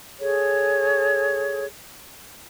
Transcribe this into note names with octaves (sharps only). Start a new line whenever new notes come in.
G#4 A4 C#5